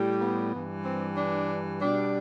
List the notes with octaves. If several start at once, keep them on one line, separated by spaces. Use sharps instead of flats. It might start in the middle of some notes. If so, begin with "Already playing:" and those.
Already playing: A2 G3
B3
G2 E3 G3
C4
D4
B2 G3 D4